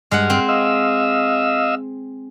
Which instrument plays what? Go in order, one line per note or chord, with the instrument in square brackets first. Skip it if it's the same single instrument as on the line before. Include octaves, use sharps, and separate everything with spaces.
[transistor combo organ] G2 F6 [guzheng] G#3 F#5
[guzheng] C4
[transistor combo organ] D#5 F5 E6